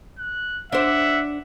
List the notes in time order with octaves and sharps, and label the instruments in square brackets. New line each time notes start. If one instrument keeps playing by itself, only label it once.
[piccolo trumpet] F#6
[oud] D4 C5 [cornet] E5 [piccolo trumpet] F#5